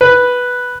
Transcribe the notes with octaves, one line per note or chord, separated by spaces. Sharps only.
B4